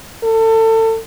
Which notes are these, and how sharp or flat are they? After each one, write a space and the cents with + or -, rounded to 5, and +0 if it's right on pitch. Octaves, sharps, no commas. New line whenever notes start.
A4 +30